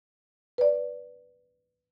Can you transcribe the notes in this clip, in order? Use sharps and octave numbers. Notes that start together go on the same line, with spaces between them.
B4 D5